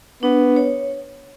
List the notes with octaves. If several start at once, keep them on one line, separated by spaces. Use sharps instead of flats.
B3 D4
C#5